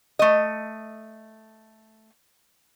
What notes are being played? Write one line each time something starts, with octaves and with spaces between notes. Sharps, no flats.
A3 D#5